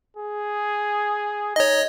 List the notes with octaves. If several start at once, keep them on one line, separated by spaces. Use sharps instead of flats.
G#4
D#4 C#5 D#5